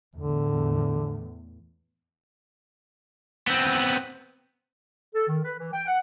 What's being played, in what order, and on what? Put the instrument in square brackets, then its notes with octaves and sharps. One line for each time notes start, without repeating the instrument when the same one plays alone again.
[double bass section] E2 A2 [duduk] D3
[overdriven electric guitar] B3 C4
[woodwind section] A4
D#3
B4
E3
G5
F#5